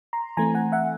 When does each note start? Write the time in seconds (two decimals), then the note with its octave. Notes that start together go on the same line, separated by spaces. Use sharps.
0.13 A#5 C6
0.37 E3 A3 C4 G#5 A#5
0.54 F#5 G#5
0.72 E5 F#5